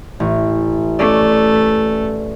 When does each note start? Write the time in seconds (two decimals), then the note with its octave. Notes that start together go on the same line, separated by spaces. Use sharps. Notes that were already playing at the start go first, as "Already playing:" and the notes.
0.20 A1
0.99 A3 C#4 D5